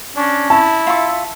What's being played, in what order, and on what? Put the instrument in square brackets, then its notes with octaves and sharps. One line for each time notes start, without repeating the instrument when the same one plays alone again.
[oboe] C#4 [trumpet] D4
[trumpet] E4 [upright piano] A5
[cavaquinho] F4 C#6 [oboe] E5